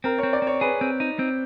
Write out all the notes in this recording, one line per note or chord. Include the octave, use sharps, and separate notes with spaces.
C4 A#4
C4 C#5
D5
C4
C#5
G#4 B4
C4
D#4
C4